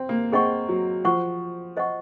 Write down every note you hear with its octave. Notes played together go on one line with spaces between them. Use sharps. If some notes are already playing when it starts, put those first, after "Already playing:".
Already playing: C4
A#3
C4 G#4 D#5 F#5 C#6
F#3
F3 C5 F#5 C#6
C5 D#5 F#5 C#6